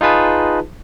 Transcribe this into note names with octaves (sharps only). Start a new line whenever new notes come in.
D#4 F4 G#4 B4 A5